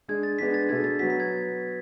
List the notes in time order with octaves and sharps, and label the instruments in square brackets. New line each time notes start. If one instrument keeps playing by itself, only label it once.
[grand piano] G#3 D4 G#4 [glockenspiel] G#6
[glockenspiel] A6
[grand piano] G#3 B3 D4 G#4 [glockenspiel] B6
[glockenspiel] A6
[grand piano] B2 A3 D4 G#4 [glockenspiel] G#6
[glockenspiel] A6
[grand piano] F#3 B3 F#4 [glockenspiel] B6
[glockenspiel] B6
G#6